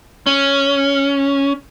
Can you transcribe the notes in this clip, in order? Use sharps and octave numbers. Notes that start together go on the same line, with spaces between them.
C#4